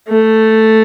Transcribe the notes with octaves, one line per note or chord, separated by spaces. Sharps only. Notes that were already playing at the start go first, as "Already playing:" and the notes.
A3